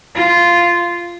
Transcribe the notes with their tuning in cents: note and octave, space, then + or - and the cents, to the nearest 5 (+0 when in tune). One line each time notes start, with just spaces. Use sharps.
F4 -10